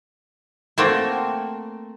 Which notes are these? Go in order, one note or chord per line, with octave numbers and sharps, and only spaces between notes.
A3 A#3 C4 F#4 A4 G5